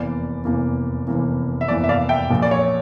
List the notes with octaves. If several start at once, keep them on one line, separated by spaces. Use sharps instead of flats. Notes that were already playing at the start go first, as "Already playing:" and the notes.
Already playing: F1 E2 E3 A#3 D5
F1 E2 E3 A#3
F1 E2 E3 A#3
E5
F1 E2 E3 A#3 D5
E5
D5 F5
E5 G5
A#1 A#2 F3
D5
C#5